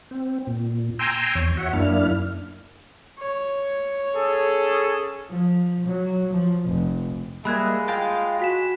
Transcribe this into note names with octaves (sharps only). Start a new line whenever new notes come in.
C4
A#2
G5 G#5 A#5 C6 E6
E2 C#5
F#4 C#5 E5 F#5
F#2 A#3 D4 E4 F6
C#5
C#4 G#4 A4
F3
F#3
F3
F1
G3 G#3 A#3 E5 B5 F#6 G#6
F4 F5 G5 A5
F#4 G#5 B6 E7